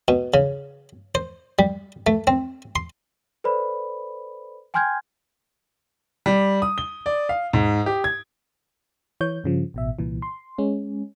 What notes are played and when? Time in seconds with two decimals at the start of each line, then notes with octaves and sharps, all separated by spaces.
0.08 B2
0.34 C#3
1.15 C5
1.59 G3
2.07 A3
2.27 C4
2.76 C6
3.44 A4 B4 C5 D5 B5
4.74 G5 G#5 C6 F6 G6 G#6
6.26 G3
6.62 D#6
6.78 G7
7.06 D5
7.29 F5
7.53 G#2
7.86 G4
8.04 G#6
9.21 E3 C#5 G6
9.44 G2 C#3 F3
9.74 A1 B2 E5
9.99 C2 A#2 E3
10.22 C6
10.58 G#3 C#4